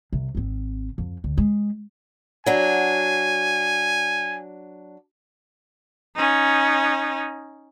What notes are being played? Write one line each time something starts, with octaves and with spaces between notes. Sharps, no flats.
C2
G#1 C4
F2
D2
G#3
F#3 D4 G#5
C#4 D#4